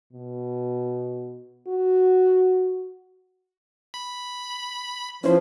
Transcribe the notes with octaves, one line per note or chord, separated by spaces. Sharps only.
B2
F#4
B5
F3 C#4 E4 B4 C5